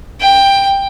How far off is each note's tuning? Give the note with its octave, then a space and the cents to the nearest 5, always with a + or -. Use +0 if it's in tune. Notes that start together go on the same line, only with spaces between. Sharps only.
G5 +10